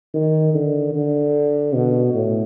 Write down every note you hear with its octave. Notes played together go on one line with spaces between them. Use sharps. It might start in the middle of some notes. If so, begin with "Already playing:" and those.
D#3
D3
D3
B2
A2